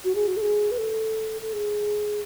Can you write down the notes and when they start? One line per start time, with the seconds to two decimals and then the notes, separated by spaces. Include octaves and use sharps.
0.04 F#4
0.15 G#4
0.27 F#4
0.37 A4
0.42 G#4
0.71 B4
0.78 A4
1.42 A4
1.53 G#4